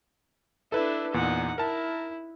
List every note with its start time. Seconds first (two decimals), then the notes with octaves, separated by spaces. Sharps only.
0.72 D4 E4 A4 B4
1.14 E2 A#2 D#4 F#5
1.58 E4 A#4 A5